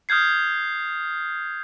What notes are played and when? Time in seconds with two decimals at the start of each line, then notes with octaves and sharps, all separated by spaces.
0.09 D#6 F6 G6 G#6 C7